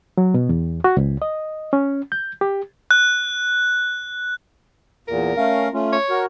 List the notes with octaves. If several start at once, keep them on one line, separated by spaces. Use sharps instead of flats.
F#3
B2
E2
F#4
C#2
D#5
C#4
G6
G4
F#6
E2 A#2 A#4
A3 C#4 F5
A3 C#4 F4
C#5
F#4 A#4